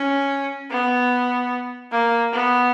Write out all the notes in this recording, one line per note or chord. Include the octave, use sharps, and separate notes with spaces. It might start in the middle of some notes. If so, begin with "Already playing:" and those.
Already playing: C#4
B3
A#3
B3